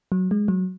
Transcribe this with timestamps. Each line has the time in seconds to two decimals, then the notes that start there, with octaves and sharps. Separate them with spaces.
0.12 F#3
0.31 G#3
0.48 F#3